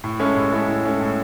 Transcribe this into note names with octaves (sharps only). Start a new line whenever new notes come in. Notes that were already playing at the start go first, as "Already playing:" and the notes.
A2
G#3 C#4 E4 A4
A2
G#3 C#4 E4 A4
A2
G#3 C#4 E4 A4
A2